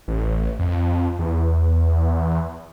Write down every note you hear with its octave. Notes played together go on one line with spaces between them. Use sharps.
A1
F2
E2